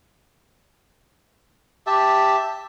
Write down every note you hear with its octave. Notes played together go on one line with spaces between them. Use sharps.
G4 E5 A5